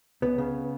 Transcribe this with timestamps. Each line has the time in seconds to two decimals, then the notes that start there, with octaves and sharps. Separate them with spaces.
0.22 C#2 B3
0.38 C#3